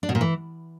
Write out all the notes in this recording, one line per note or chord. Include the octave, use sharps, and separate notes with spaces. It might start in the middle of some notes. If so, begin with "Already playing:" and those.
D4
B2
A#2
E3